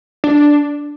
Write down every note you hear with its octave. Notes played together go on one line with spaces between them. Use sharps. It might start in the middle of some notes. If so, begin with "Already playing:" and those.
D4